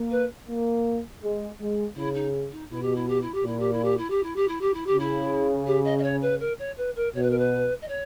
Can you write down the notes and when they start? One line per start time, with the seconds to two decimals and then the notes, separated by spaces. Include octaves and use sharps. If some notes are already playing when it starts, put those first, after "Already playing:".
Already playing: A#3
0.11 B4
0.48 A#3
1.22 G#3
1.59 G#3
1.96 C#3 E4
2.14 D#4
2.52 D#4
2.70 B2 E4
2.83 G4
2.95 E4
3.09 G4
3.22 E4
3.34 G4
3.44 A#2 E4
3.59 G4
3.72 E4
3.84 G4
3.98 E4
4.10 G4
4.23 E4
4.36 G4
4.48 E4
4.61 G4
4.74 E4
4.86 G4
4.92 C#3
4.99 E4
5.67 G4
5.85 D#5
5.99 D#5
6.03 C#5
6.22 B4
6.40 A#4
6.59 C#5
6.77 B4
6.96 A#4
7.14 B2 C#5
7.23 B4
7.30 A#4
7.38 B4
7.82 D#5
7.88 C#5